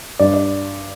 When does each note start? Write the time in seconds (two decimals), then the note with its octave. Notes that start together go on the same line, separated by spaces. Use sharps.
0.19 G2 D5
0.34 D5